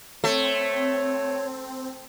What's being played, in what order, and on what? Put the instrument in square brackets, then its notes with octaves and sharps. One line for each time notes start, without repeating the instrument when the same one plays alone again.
[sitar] A3 [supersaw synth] C4 [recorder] C#5